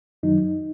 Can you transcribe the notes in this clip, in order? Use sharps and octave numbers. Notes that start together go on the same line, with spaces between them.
F#2 D#3 F#3 D#4